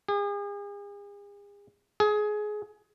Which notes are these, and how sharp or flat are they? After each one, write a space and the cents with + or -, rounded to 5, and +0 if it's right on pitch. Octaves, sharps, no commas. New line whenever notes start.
G#4 -40
G#4 +20